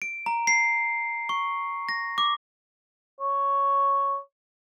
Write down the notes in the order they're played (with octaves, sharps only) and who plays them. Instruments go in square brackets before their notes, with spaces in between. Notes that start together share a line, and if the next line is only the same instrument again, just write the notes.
[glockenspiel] D7
A#5
C7
C#6
A#6
D6
[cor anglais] C#5